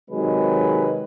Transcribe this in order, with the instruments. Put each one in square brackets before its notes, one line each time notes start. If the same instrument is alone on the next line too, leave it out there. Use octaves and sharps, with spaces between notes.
[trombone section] C3 D#3 F#3 G#3 B4